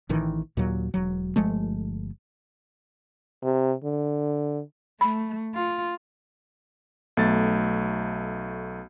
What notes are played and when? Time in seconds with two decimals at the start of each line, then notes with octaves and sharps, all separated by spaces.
0.09 A1 A2 D#3 E3
0.57 D#2 A#2 F#3
0.94 E1 F#3
1.36 G1 F3 G#3 A3
3.43 C3
3.84 D3
5.01 A3 B5
5.55 F4
7.17 B1 A3 A6